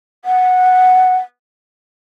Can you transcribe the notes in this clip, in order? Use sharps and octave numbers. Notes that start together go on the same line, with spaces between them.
F#5